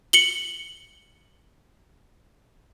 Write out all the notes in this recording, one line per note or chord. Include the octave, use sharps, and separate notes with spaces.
C#7 F#7 G7